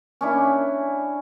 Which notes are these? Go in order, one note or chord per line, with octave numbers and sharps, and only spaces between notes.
C#4 D4 E4